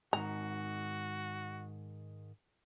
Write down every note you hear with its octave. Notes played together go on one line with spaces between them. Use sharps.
G#2 D#3 F#4 A#5